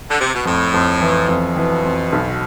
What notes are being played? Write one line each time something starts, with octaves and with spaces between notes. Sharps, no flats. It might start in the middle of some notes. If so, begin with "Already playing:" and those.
D3
C3
B2
F2 A2
F2
E3
F2 B2
E3
F2
B1